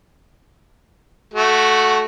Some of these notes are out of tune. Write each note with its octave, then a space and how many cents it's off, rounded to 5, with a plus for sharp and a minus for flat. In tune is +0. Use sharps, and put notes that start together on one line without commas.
A3 -10 F#4 +0